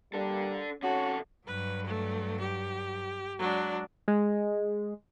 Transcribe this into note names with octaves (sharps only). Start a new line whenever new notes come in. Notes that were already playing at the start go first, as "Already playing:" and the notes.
G3 A#3 D4 A4
C3 C#4 F#4 A4 C#5
G2 F#3 B4
A3
G4
F#3 G#3 D4
G#3